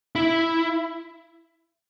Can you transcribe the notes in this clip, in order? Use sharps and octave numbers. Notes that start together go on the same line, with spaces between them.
E4